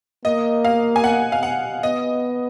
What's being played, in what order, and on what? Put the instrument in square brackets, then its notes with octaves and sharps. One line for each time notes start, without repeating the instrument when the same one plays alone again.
[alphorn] A#3 [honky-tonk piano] D#5
[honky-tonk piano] F5
G#5
F#5
F5
F#5
[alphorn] B3 [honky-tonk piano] D#5